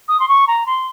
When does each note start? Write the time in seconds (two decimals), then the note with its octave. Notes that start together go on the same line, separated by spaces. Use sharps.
0.08 D#6
0.20 C6
0.28 C#6
0.48 A#5
0.66 C6